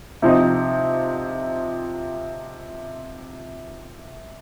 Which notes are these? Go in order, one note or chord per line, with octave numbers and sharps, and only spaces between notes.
C3 F3 C4 D#4